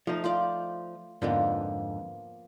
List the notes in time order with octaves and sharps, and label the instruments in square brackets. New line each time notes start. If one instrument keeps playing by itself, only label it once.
[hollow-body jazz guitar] F3 D#4 [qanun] A3
[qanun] F4 C5 D5
[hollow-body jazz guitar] F2 G#2 D3 [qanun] F3 A#3 B3